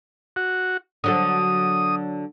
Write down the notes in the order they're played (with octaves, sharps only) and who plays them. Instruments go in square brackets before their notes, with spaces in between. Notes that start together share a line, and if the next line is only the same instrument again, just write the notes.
[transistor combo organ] F#4
[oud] D3 F#3 A4 [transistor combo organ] D#6